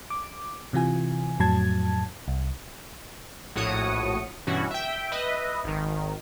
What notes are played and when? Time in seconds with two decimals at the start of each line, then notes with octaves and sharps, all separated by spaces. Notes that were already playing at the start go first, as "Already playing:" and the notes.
0.10 D6
0.73 C3 E3 F4 G#5
1.39 F2 A2 F#3 A5 G#6
2.28 C2
3.55 A#1 A2 F#4 C#5 D#6 C#7
4.47 G2 B2 E3 C#4 F#4
4.71 E5 G5
5.12 B4 D#5 E5
5.64 G#1 D#3